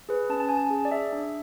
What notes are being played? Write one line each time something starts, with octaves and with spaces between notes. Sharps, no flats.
G#4 B4
C#4 A5
A5
C#4 G#5
A5
G#4
D5
G#4 E5
D4